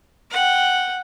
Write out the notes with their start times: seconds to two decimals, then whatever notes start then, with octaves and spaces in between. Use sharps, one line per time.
0.31 F#5 G5